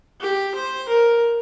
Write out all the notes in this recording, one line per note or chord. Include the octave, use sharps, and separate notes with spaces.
G4
C5
A#4